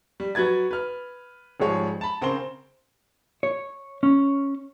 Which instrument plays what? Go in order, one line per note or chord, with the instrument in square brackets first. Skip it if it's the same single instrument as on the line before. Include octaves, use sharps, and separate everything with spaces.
[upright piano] G3
F#3 F#4 B4 G#6 A6
B4 F6
G#1 F3 G3 G#3 C#5
A5 B5
C#3 C4 A#4 C5 G7
[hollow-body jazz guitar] C#5
C#4